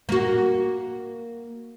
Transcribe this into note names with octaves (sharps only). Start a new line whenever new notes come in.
A#3 F#4